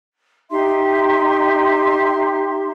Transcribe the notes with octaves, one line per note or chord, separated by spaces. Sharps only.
D#4 G4 E5 C6